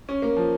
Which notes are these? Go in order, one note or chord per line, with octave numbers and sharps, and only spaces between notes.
C#4
A#3
F3